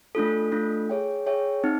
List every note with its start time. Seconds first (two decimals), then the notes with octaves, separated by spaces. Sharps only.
0.15 A3 D4 F4 A4
0.52 A3 D4 F4 A4
0.89 G#4 C#5 E5 G5
1.26 G#4 C#5 E5 G5
1.64 C4 D#4